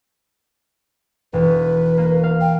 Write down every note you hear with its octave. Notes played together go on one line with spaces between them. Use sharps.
E1 B4
A#3
F5
G5